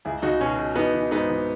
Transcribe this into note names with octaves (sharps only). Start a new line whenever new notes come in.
C#2 E4 G#4
C#2 D#4 F#4
B2 C#4
B2
E3 B3 D#4
E3
G#2 B3 D#4
E3